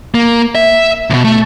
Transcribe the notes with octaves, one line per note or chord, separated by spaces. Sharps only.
A#3
E5
D2 B2
A3